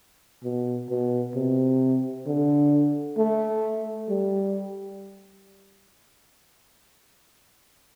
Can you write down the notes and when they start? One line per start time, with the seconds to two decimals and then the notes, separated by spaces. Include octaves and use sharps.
0.44 B2
0.90 B2
1.35 C3
2.27 D3
3.18 A3
4.09 G3